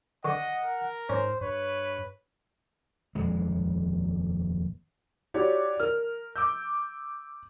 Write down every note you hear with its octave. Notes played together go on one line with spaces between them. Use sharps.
D3 D#5 F#5 C#6
A#4
G#2 C#4 C5
G2 B4 C#5
D#1 F2 G#3
E4 F#4 G4 C#5 D5
A#4 F6
D6 E6 G6